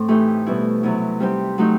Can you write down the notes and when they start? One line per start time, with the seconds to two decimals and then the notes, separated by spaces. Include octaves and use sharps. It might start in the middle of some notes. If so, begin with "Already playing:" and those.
Already playing: A2 C4
0.08 E3 A3 D#4 G4
0.46 B2 G3 B3 E4
0.83 C3 F#3 B3 E4
1.20 G3 C4 D#4 G4
1.58 F#3 A3 D#4 G4